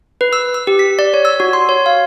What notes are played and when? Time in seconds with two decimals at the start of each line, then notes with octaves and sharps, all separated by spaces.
0.21 B4
0.33 E6
0.54 E6
0.67 G4
0.79 B6
0.99 D5
1.14 C#5
1.25 E6
1.40 F#4
1.53 C6
1.69 C#5
1.86 F5